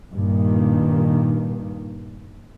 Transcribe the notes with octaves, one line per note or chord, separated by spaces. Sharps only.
G2 A#2 D#3